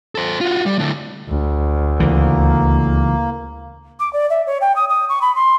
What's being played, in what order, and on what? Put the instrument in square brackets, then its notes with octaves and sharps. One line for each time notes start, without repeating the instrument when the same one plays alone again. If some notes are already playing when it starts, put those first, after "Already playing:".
[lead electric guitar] A4 C5
F4 F#4
G3
A2 D3
[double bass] D2
[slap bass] C#2 E3 [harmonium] A#3
[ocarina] D6
D5
E5
C#5
G5
D#6
D#6
C#6
B5
C6